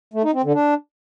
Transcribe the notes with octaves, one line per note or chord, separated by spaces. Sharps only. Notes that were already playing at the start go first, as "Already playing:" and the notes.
A3
D#4
C4
D3
D4